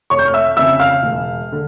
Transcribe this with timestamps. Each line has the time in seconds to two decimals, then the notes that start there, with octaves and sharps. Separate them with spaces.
0.10 F1 C#5 C#6
0.19 G6
0.26 F6
0.34 E5 E6
0.57 F2 C#3 E5 E6
0.79 F5 F6
1.03 E1
1.52 D3